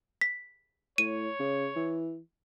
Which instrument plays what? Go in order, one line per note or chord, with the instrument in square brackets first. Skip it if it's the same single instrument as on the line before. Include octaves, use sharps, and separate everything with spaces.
[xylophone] B6
[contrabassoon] A2 [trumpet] C#5 [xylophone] D#7
[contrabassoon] C#3
E3